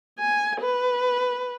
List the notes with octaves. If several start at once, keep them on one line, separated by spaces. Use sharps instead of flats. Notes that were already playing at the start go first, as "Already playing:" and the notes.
G#5
B4